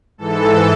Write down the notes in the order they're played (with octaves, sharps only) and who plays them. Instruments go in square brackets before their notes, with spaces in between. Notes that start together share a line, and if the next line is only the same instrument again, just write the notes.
[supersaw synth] G#2 E3 A4